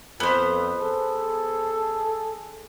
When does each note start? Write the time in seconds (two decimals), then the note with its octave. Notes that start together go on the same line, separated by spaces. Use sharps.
0.20 F2 B3 C5
0.80 G#4 A4